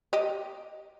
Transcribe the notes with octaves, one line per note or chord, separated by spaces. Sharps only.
G4 D#5